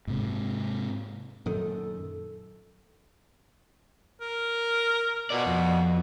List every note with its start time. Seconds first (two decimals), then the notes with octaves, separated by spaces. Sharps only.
0.07 G#2 C3
1.46 F#2 A#2 D#3 A4
4.21 A#4
5.30 B2 A#4 D5
5.46 F2